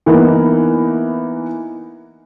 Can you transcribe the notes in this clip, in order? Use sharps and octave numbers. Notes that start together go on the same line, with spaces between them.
E3 A#3 B3 D#4